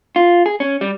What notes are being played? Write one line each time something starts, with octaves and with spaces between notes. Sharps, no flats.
F4
G#4
C#4
G3